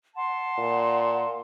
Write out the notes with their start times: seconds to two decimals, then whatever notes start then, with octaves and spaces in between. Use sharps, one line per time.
0.14 F#5 A5 C6
0.58 A#2